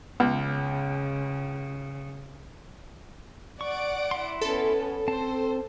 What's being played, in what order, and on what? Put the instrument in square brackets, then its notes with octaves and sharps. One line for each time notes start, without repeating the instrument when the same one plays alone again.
[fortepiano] C#2 [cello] C#3 [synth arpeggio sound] B3
[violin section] D5 F#5 D7 [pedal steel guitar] C#6
[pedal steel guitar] E4 C6
[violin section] B3 C#4 [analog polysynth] A4
[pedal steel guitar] C4 A5 [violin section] C5